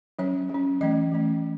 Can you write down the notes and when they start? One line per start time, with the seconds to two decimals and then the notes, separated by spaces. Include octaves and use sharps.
0.19 F#3 C#4 C#5
0.49 F#3
0.55 C#4
0.81 E3 A3 C#4 D#5
1.12 E3 A3 C#4